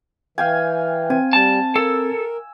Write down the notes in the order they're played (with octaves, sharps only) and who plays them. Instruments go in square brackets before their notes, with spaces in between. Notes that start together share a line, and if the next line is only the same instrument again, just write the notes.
[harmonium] E3 [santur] F5 G5 G#5
[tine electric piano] C4 [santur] G#5
[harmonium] G3 [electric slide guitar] A5
[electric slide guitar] A4 [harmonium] A#4 [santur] E6